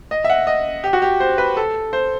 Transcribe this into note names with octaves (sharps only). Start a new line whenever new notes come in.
D#5
E5
F#5
D#5
G4
F#4
G4
C5
B4
A4
C5